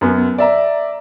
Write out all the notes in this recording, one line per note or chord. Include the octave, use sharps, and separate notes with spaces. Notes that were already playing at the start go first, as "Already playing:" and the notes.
F#2 B3
D5 E5 A#5